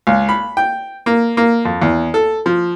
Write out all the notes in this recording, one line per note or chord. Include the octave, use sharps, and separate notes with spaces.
C#2
B5
G5
A#3
A#3
F2
E2
A4
F3